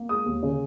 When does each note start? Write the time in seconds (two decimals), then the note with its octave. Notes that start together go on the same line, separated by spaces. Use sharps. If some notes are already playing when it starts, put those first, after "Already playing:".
Already playing: A#3
0.09 G#3 D#6
0.26 D#2
0.43 C#3